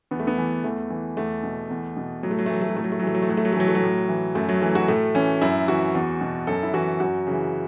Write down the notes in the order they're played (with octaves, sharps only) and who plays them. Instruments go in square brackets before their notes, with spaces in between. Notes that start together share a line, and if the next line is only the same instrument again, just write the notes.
[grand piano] E2 B3
A3
B3
E3
E2 A3
E3
E2 A3
B2
E2
B2
A2 F#3
A3
F#3
A3
E3 F#3
A3
F#3
A2 A3
F#3
A3
F#3
E3 A3
F#3
A3
A2 F#3
A3
F#3
A3
E3 F#3
A3
F#3
A2
E3
F#2 A3
F#3
E3 A3
F#4
A2 A3
E3 C#4
F#2 E4
E3 F#4
E2
B2
F#2 A4
E4
E3 F#4
F#2 F#4
C#3 E3